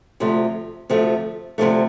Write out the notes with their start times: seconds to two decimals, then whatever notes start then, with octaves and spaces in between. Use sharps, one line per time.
0.20 D2 C3 F3 A3
0.90 D2 C3 F3 A3
1.58 D2 C3 F3 A3